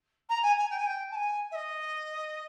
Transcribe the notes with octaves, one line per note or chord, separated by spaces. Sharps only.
A#5
G#5
G#5
G5
G#5
G5
A5
G#5
E5
D#5